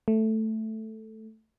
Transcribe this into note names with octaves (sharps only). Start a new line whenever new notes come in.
A3